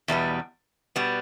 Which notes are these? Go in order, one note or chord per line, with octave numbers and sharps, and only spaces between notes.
E2 B2 G3 B3
B2 G3 B3